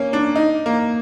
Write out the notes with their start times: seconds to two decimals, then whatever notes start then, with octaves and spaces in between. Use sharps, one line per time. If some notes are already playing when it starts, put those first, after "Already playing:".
Already playing: A#3 C#4
0.13 D4
0.36 D#4
0.66 A#3